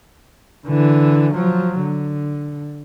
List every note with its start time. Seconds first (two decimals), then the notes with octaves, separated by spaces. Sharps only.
0.68 D3 E3
1.34 F3 F#3
1.80 D3